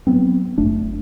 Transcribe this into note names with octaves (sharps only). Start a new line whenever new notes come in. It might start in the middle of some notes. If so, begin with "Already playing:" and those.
F#3 B3 C4
F#1 A3 D4